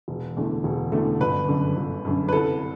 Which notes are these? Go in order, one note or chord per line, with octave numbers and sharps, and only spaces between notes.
E1
E2 D3 A3
E1
E2 D3 A3
G1 B4
F#2 D3
G1
F#2 D3
B4
C2 A4